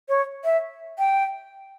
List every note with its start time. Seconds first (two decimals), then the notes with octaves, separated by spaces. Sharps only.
0.09 C#5
0.45 E5
0.99 G5